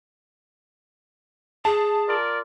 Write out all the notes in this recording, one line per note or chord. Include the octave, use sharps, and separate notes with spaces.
G#4 A5
F4 A#4 D5